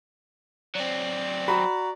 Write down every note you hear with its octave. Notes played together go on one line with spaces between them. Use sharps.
F#3 C4 D5
F#4 A#5 B5